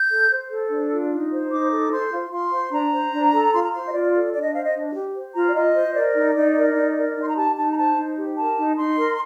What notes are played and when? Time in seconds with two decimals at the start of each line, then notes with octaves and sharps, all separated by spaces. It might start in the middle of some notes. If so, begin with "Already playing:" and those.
Already playing: G6
0.10 A4
0.30 C5
0.49 A4
0.70 D4
0.91 F4
1.10 D#4
1.31 C5
1.51 D#4 D6
1.71 A4
1.91 C5 C6
2.11 F4
2.31 F4 C6
2.51 C5
2.71 D4 A#5
2.92 C5
3.12 D4
3.32 A4
3.52 F4 C6
3.62 A#5
3.72 C5 C6
3.87 D#5
3.93 F4 D5
4.13 A4
4.34 D4 D5
4.44 D#5
4.53 C5 F5
4.64 D#5
4.74 D4
4.94 G4
5.15 C5
5.34 F4 A#5
5.47 D5
5.54 F4 D#5
5.75 C5
5.95 A#4 D5
6.15 D#4
6.35 D#4
6.55 A#4
6.75 D#4
6.96 A#4
7.16 D#4 C6
7.28 A#5
7.36 G4 A5
7.56 D#4 A5
7.71 A#5
7.76 C5 A5
7.97 D#4
8.17 G4
8.37 A#4 A5
8.57 D#4
8.77 D#4 C6
8.97 A#4